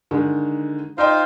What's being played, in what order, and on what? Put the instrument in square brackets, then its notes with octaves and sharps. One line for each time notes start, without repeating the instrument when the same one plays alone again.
[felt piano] D3 D#3 G#3
[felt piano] D#4 D#5 G5 [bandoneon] F4 C5 F5